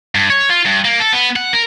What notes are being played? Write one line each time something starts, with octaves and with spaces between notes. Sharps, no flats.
G2
C#5
F4
G2
A#3
A4
B3
F#5
A#4